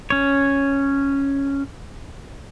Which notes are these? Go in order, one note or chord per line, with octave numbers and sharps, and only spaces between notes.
C#4 C#5